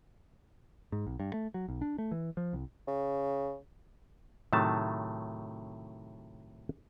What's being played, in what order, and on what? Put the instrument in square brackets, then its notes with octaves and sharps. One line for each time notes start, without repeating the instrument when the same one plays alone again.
[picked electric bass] G#2
B1
G2
A3
F#3
B1
D4
A3
E3
F3
C2
[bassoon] C#3
[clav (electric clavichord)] A2 C3 D#3 F#3 A3 A5